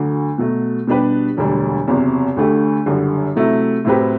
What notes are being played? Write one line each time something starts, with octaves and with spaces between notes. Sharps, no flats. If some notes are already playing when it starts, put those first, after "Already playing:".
Already playing: D2 D3 F#3
B2 F#3 A3
B2 G3 D4 G4 B4
E1 D2 D3 G3 D4
F#1 E2 C3 F#3
D2 D3 A3 D4 G4
F#1 F#2 D3 G3
C3 F#3 A3 E4
A2 F#3 C4 G4 B4